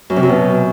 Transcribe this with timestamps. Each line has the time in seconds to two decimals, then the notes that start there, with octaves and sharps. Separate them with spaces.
0.10 F#2
0.16 C3
0.23 F#2
0.29 B2